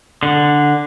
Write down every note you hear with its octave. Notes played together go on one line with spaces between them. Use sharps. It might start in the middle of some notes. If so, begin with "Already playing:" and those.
D3